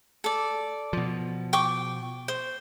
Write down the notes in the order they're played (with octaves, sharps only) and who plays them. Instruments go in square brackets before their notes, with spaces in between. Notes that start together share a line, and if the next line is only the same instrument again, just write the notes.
[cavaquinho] A4 D5
[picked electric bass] B2 F3
[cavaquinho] G5 C#6 D6
C5